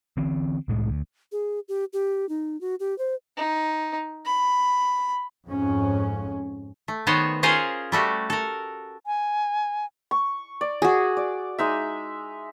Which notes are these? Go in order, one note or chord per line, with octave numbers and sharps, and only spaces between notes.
D3 E3 C4
C2 A2 G#3
D2
G#4
G4
G4
D#4
F#4
G4
C5
D#4
B5
F2 G#2 C#4
A3
D#3 B3 F#4 C5 C#5
C#4 F4 G#4 A#4 C5 C#5
G3 A3 F#4 G4
A4 A#4
G#5
C#6
D5
F#4 G#4
D5
G#3 D#4 E5